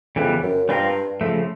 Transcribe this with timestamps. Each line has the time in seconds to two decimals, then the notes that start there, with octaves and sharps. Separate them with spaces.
0.16 F2 C#3 E3 G3 B3
0.43 F#2
0.69 G2 G3 C4 F4 A#4
1.21 C#3 F3 A3